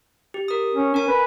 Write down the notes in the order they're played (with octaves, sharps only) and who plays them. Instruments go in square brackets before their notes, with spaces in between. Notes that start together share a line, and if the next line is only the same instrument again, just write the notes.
[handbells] G4
A#4 D#6
[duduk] C#4
[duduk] C#4 [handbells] A#4 G#5
[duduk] B4